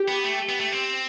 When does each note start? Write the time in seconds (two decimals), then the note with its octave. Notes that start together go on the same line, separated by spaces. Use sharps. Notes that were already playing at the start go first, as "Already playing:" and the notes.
Already playing: G4
0.08 B3
0.24 A3
0.49 B3
0.60 A3
0.72 C4